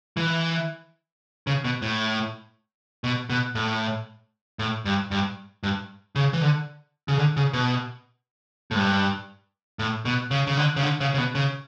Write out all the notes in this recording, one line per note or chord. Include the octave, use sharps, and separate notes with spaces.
E3
C#3
B2
A2
B2
B2
A2
A2
G2
G2
G2
C#3
E3
D3
C#3
D3
C#3
B2
A2
G2
A2
B2
C#3
C#3
D3
C#3
D3
C#3
C#3
B2
C#3